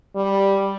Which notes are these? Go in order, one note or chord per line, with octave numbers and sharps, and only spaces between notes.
G3